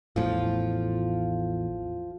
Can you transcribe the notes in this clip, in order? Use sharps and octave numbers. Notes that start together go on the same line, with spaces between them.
A1 E2 A2 F3 F4